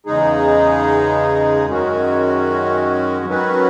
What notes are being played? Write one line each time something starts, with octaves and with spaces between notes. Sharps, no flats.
E2 C#3 G#3 D#4 G#4
F#2 D#3 G#3 C#4 F#4
D#3 F#3 C#4 F#4 B4